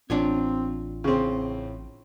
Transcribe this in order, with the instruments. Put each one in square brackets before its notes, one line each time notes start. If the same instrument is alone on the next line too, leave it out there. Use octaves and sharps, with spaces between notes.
[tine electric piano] A1 [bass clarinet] C4 [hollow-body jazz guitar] D4 F4 C#5
[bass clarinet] A2 [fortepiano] C#3 C4